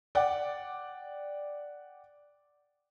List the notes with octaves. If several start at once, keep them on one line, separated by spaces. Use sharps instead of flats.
D5 F#5 G5 D6